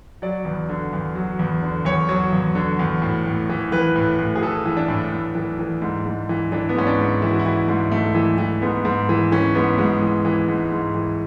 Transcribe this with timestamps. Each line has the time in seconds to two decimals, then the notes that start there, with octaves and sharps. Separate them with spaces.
0.22 F#3 D5
0.45 E2
0.69 D3
0.93 E2
1.15 F#3
1.39 E2
1.62 D3
1.85 E2 C#5
2.09 F#3 C#5
2.32 E2
2.55 D3
2.79 E2
3.02 A2
3.26 A2
3.49 E3
3.72 E3 B4
3.96 A2
4.19 A2
4.36 G#4
4.42 E3 A4
4.65 E3
4.77 D4
4.88 A2
5.12 A2
5.35 E3
5.59 E3
5.82 G#2
6.06 G#2
6.29 E3
6.52 E3 D4
6.69 B3
6.75 G#2 C#4
6.87 D4
6.99 G#2
7.22 E3 E4
7.30 F#4
7.39 E4
7.46 E3
7.68 G#2
7.91 G#2 A3
8.15 E3
8.38 E3
8.62 G#2 B3
8.85 G#2
9.09 E3
9.32 E3 C#4
9.55 G#2 B3
9.78 G#2 G#3
10.02 E3
10.25 E3
10.48 G#2
10.72 G#2
10.95 E3